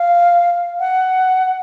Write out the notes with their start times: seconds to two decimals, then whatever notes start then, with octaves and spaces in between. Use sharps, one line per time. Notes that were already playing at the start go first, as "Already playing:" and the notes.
Already playing: F5
0.79 F#5